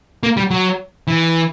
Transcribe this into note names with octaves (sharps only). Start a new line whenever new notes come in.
A#3
G3
F#3
E3